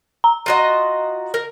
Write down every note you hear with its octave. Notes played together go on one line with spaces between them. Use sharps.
A#5
F4 F#4 D#5
A#4